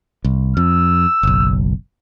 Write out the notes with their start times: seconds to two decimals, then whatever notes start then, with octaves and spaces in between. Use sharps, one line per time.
0.24 C2
0.57 F2 E6
1.23 F#1 B1